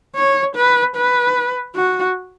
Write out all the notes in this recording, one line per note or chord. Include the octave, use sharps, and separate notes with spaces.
C#5
B4
B4
F#4